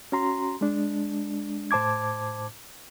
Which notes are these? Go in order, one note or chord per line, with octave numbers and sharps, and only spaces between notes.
C#4 F#4 A#5 C6
G#3 D4
A2 C5 A5 D6 G#6